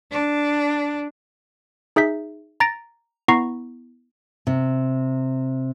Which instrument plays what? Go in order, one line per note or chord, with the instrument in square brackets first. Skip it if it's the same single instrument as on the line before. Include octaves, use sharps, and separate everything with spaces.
[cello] D4
[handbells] D#4 G#4 E5 G6 B6
A#5 A6 A#6 D7
B3 E4 A#5 C#6 A#6 C7
[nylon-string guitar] C3